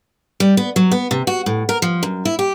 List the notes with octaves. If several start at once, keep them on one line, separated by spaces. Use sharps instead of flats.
G3
B3
F#3
B3
C3
F#4
A2
A#4
F3
F#2
E4
G4